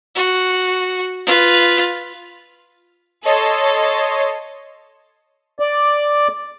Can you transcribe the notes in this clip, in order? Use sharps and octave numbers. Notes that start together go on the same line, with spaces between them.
F#4
F4 B4
A4 C#5 D#5 C6
D5